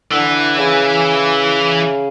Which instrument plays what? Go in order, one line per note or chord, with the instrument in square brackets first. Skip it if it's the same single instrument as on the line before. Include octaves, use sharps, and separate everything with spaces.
[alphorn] D3 [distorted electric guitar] E3
[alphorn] C#3